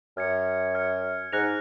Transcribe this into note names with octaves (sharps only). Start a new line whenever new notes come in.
F#2 F6 G#6 C#7
F6 G#6 C#7
G#2 F#6 A#6 C#7 F7